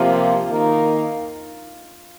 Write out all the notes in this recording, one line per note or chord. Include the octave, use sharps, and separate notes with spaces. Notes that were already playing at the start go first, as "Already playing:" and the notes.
Already playing: C3 F3 A#3 F4
D#3 A#3 D#4